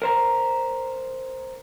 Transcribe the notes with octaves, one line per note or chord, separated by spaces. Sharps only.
A#4 C5 A#5